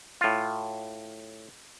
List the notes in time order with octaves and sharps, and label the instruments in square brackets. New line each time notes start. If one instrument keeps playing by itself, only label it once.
[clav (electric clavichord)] A2 F4